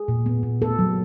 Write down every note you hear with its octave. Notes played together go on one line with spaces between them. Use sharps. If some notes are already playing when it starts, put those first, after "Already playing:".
Already playing: G#4
A#2
B3
A#2
B3 A4
F#3